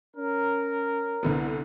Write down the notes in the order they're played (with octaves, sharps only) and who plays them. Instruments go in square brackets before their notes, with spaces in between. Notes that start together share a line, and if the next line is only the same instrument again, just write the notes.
[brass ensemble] C#4 A#4
[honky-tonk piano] C2 D3 B3